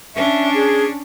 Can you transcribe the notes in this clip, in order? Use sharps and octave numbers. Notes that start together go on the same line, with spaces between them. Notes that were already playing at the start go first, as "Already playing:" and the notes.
C#4 D4 E5
G#4